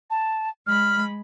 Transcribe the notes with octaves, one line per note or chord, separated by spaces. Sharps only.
A5
G#3 B5 F6